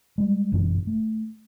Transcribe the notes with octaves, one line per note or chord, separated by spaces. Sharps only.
G3 G#3
G1 F#2 B2 E3
A3